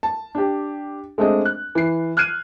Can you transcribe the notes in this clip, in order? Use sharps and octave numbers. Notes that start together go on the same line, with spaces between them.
A5
D4 G4
G#3 A3 C4 D4 G#4 D#5
F#6
E3 C7
F6 F#6 G#6 C7 D#7